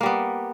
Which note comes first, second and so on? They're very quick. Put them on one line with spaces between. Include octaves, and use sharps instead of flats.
A#3 G3 B3